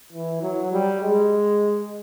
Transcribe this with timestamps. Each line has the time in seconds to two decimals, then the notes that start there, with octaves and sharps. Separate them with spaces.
0.13 E3
0.42 F#3
0.72 G3
1.02 G#3